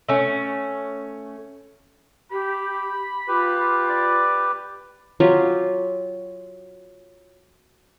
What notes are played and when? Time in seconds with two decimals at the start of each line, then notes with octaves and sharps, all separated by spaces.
0.09 A3 C#4
2.31 G4 B5
3.28 F4 G4 B4
3.89 D5
5.20 F#3 F4 G4